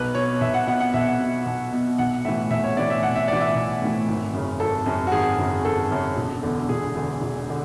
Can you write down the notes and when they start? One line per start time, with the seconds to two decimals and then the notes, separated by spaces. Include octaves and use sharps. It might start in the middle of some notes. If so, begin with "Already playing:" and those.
Already playing: B1 B4
0.15 B2 C#5
0.41 B1 E5
0.54 F#5
0.67 B2 F#5
0.80 F#5
0.94 B1 E5
1.19 B2
1.46 B1
1.72 B2
1.98 B1 F#5
2.25 A2 E3 E5
2.50 B1 E5
2.64 C#5
2.77 A2 E3 D5
2.90 E5
3.02 B1 F#5
3.16 E5
3.28 A2 E3 D5
3.41 E5
3.55 B1
3.82 A2 E3
4.08 G#1
4.33 F#2 C#3
4.60 G#1 A4
4.86 F#2 C#3
5.07 F#4
5.12 G#1 G#4
5.38 F#2 C#3
5.64 G#1 A4
5.91 F#2 C#3
6.17 E1
6.43 E2 D3
6.69 E1 G#4
6.95 E2 D3
7.22 E1
7.50 D3